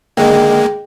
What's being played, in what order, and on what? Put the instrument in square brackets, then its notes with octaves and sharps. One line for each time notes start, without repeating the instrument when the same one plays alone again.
[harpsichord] D3 D#3 [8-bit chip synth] G#3 A#3 [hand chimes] G#4 G5